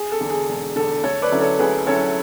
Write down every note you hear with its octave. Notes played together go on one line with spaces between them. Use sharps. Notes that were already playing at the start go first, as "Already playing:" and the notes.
Already playing: G#4
A4
E2 D3
G#4
E1
E2 D3 A4
D2 A4 C#5
B4 D5
D3 F#3 C#4 E4
A4 C#5
D2 G#4 B4
D3 F#3 C#4 E4 A4 C#5